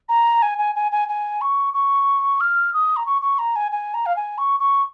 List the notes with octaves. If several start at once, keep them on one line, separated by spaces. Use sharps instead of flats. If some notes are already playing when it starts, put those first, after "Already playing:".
A#5
G#5
G#5
G#5
G#5
G#5
C#6
C#6
F6
D#6
A#5
C#6
C#6
A#5
G#5
G#5
A#5
F5
G#5
C#6
C#6